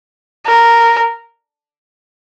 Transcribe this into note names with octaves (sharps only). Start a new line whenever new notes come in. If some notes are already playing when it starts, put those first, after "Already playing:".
A#4